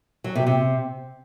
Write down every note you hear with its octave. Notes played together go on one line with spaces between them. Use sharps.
F#3
C3
C3